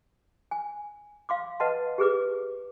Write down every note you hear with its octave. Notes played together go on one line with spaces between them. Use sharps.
G#5
F5 C6 D6
B4 D#5 F#5 A5 C6
G4 G#4 B4 D6